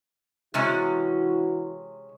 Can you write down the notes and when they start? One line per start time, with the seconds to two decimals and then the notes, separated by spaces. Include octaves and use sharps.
0.54 C3 E3 G#3 C#4 E4 F#4